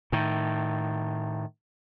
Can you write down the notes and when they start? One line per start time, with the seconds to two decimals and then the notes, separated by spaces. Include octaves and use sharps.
0.12 A2 D#3